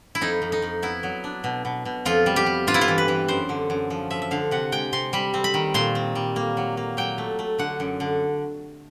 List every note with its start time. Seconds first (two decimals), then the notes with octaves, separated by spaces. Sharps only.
0.15 E4
0.21 F2 D#4
0.42 F2
0.52 D#4
0.62 F2
0.82 B3 E4
1.03 F#3
1.24 D4
1.44 B2
1.65 B2
1.85 B2
2.05 F2 F4
2.26 G3
2.36 G4
2.46 G3
2.67 G2 F4
2.74 E4
2.81 F4
2.88 E3
2.98 B4
3.08 E3
3.28 F#2 C5
3.49 D3
3.70 F#2
3.90 F3
4.10 F3 E5
4.22 E5
4.31 D3 F5
4.51 C3 F#5
4.72 G#3 G5
4.93 C3 C6
5.13 G3 B5
5.34 C4
5.44 B5
5.54 D#3
5.74 A#2 C6
5.95 C4
6.15 G3
6.36 A#3
6.57 F#3
6.77 A#3
6.97 F#3 G5
7.18 A3
7.39 A3
7.59 D3 F#5
7.80 F#2
8.00 D3